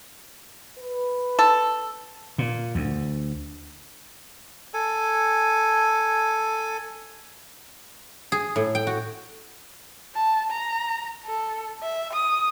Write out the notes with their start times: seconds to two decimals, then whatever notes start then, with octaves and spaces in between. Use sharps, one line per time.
0.78 B4
1.39 A4
2.38 A#2
2.75 D2
4.74 A4 G#5
8.32 G#4
8.56 A2
8.75 G5
8.87 F#4
10.15 A5
10.51 A#5
11.25 A4
11.83 E5
12.13 D#6